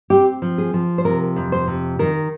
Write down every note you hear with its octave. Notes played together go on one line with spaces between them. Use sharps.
C4 G4
F3
G#4
F3
C5
C3 A#4
F2
C5
C3
D#3 A#4